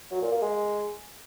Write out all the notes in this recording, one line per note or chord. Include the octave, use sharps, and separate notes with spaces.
F#3
A#2
A#3
G#3